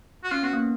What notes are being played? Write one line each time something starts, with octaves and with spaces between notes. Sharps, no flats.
F#4
C#4 F4
B3 F#4
A#3